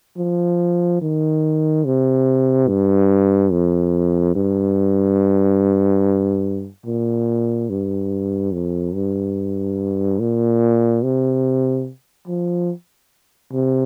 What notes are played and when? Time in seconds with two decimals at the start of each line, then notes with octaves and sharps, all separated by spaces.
0.17 F3
1.01 D#3
1.85 C3
2.68 G2
3.51 F2
4.35 G2
6.85 A#2
7.69 G2
8.52 F2
8.94 G2
10.19 A#2
11.03 C3
12.27 F3
13.53 C3